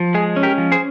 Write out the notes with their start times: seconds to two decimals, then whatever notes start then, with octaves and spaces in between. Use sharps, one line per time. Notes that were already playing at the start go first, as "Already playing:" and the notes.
Already playing: F3
0.14 G#3 G#4
0.36 C#4
0.43 G4 A#4
0.58 F3
0.72 G#4 C5